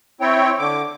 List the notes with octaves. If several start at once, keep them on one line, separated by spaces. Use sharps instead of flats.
C4 E4 C#5 G5
D3 D6